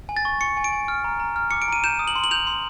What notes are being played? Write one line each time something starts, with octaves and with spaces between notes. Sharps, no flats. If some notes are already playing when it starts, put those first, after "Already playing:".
G#5
A6
C#6
C#6 C#7
G#5
D7
G#5
F6
A#5
A#5
F6
D6 C#7
D7
A#5 D#7
G6 E7
D#6
F#7
C6
F#7
G6 F7
C6